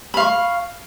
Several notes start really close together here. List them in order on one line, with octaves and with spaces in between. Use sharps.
B5 F5 C#6